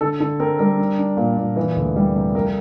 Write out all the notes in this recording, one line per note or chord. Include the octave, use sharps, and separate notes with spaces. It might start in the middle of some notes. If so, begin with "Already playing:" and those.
D3 A4
D3 A4
C4 A#4
G3 A#4
D4
D4
A#2
A#2
E3
D2
G3
C3
F2 A#4